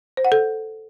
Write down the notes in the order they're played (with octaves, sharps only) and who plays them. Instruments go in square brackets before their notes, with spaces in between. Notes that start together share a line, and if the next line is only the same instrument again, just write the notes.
[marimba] C5
F#5
A4